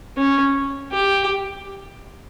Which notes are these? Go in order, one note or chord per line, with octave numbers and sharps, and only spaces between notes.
C#4
G4